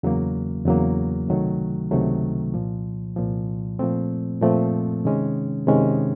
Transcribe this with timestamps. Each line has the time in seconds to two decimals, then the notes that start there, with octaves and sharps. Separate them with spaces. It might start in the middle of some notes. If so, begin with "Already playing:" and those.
0.03 E2 C#3 F#3 A#3
0.65 E2 C#3 F#3 A#3
1.28 C#2 C3 D#3 F#3 A3
1.91 C#2 C3 D#3 F#3 A3
2.54 C2 A#2 F3
3.16 C2 A#2 F3
3.79 A#2 F3 A3 C4
4.42 A#2 F3 A3 C4
5.05 C3 D#3 G#3 C#4
5.67 C3 D#3 G#3 C#4